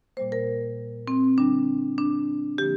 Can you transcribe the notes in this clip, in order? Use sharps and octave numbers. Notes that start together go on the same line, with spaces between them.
A#2 G3 A#3 C5
A#4
C4
D3 G3 C4 D4
D4
D3 F3 A#3 G4